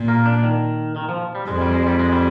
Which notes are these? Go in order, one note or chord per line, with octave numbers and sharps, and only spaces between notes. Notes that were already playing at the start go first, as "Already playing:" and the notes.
Already playing: A#2
A#3
D4
D#3
D#3
F3
G3
F2 G#3
G3
G#3
G3
G#3
G3